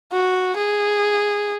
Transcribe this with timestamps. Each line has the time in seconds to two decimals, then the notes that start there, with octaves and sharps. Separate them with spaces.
0.12 F#4
0.57 G#4